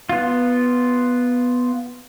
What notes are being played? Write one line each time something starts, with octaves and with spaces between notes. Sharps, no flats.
B3 F4